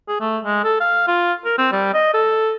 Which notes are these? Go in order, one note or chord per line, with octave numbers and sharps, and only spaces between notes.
G#4
A3
G#3
A4
F5
F4
A#4
C4
G3
D#5
A4